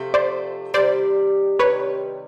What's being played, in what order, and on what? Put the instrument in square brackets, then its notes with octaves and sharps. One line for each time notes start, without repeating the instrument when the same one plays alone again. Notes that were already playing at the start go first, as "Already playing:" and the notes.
Already playing: [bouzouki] C3 F3 A3
[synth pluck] C5 D5
[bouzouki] C3 D#3 G3 [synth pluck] C5 D5
[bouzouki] C3 D#3 G3 [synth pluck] B4 C#5